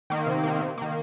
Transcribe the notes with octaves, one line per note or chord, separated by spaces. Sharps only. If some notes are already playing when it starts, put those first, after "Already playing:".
D#3 A#3
C3
D#3 A#3
C3
D#3 A#3